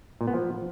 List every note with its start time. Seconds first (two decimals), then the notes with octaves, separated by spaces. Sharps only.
0.21 A#2
0.27 B3
0.34 F3